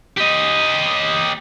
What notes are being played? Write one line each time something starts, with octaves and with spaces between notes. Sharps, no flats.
G4 D#5